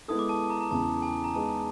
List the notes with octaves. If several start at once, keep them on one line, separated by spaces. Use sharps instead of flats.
G#3 B3 E4 A4 D#6
D6
A5
A#5
A#5
E2 C#3 E3 A5
G#5
A#5
G#3 B3 D#4 G#4 A5